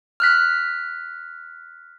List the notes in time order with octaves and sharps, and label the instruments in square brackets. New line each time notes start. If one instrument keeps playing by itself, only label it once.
[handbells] F6 F#6 B6